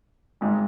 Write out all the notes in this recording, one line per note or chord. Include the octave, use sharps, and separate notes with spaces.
G#1 G#2 G#3